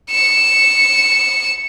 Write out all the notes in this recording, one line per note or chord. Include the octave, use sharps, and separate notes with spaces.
C#7 E7